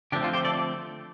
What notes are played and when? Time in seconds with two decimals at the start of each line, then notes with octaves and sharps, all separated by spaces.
0.12 D3 F3 A3 C4 D4 G4
0.23 F4 A4
0.33 G4 C5
0.45 A4 D5